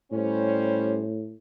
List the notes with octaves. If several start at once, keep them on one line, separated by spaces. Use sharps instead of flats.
A2 G3 C#4 C5